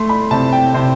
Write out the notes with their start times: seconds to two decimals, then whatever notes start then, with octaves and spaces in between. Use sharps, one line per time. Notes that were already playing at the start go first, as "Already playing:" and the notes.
Already playing: A3 C6
0.09 B5
0.31 C3 A5
0.53 G5
0.74 C3 C5